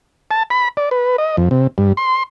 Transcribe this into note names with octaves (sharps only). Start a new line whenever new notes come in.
A5
B5
D5
B4
D#5
F2
C3
G2
C6